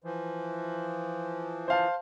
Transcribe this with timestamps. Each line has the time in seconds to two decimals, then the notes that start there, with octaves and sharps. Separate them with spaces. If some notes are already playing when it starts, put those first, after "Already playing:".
0.04 E3 F3
1.68 C5 F5 A5